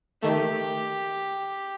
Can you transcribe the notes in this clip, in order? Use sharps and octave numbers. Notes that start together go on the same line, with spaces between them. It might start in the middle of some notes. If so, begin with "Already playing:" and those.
D#3 A3 G4